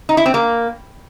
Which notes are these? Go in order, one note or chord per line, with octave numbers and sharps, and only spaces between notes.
D#4
E4
C4
A#3